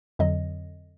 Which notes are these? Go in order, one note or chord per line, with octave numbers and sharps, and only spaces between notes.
F2 D3 F#3 D#5